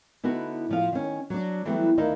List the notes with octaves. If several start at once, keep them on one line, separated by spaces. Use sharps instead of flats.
D3 B3 D#4 E4 F#4
A2 F3 F5
D#3 C#4
F#3 D4
E3 F#3 G3 A3 B3
D2 D#3 D#4 E4 F5